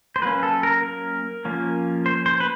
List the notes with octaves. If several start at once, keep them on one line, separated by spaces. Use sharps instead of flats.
C5
F#3 A#3 C#4 B4
A4
A#4
A#4
F3 A#3 C#4
C5
C5
B4